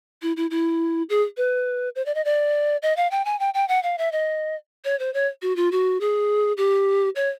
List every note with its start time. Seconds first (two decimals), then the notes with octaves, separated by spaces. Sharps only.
0.22 E4
0.37 E4
0.51 E4
1.10 G#4
1.37 B4
1.96 C5
2.06 D5
2.15 D#5
2.25 D5
2.82 D#5
2.97 F5
3.11 G5
3.25 G#5
3.40 G5
3.54 G5
3.68 F#5
3.83 F5
3.98 E5
4.12 D#5
4.85 C#5
4.99 C5
5.14 C#5
5.42 F#4
5.56 F4
5.72 F#4
6.01 G#4
6.57 G4
7.16 C#5